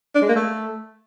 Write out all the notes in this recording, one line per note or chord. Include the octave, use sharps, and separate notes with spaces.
D4
G#3
A#3
A3